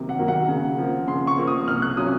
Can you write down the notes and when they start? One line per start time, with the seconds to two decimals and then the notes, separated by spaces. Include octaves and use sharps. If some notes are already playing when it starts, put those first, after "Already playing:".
Already playing: C3 D#3 F#3 A#3
0.09 F#5
0.18 D#3 F#3 A#3
0.28 F#5
0.48 C#3
0.78 F3 A#3
1.07 C#3 C6
1.27 C#6
1.38 F3 A#3
1.47 D#6
1.67 C2 F6
1.82 F#6
1.97 C3 F#3 C#4 F4 D#6